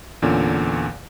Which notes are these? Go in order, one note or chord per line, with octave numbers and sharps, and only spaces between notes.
E2 A#2 D3 C#4